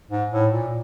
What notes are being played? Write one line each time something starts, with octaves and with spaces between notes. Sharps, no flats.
G#2
A2
A#2